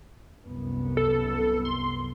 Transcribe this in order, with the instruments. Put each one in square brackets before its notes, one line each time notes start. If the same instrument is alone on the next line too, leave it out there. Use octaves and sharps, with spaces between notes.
[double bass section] C2 F#2 B3
[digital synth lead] A4
C6